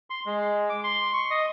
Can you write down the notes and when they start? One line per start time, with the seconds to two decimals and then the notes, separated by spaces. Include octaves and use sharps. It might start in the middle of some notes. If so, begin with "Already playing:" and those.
0.10 C6
0.26 G#3
0.69 D6
0.84 C6
1.13 C#6
1.30 D#5